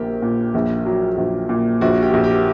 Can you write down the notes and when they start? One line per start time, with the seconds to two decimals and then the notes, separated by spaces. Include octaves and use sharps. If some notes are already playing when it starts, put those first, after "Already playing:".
Already playing: A#1 A#3 G4
0.22 A#2
0.54 A#1
0.86 F#3
1.17 A#1
1.49 A#2
1.81 A#1 F#4
2.03 G4
2.13 A#1
2.24 G4